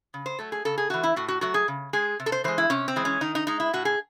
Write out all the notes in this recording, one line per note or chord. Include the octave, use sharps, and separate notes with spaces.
C#3
C5
F#3 A3 A4
G#4
C#3 A4
G#4
E3 A3 F#4
E4
A2 F#4
F#4
F#3 A3 F#4
G#4
C#3
G#3 G#4
C3
A4
C5
E3 G#3 C5
E4
C3 C#4
C4
E3 G#3
C#4
D#3 D#4
D#4
G#3 D#4
E4
A2 F#4
G#4